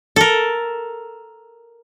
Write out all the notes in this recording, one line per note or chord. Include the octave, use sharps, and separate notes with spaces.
A4 A#4